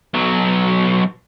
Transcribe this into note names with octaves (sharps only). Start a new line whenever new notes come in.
B1 F#3